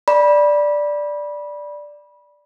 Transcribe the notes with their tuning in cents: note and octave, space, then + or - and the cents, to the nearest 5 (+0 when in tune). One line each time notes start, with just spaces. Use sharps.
D5 +0 B5 -25